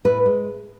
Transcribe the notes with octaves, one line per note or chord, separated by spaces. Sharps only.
A2 B4
G#3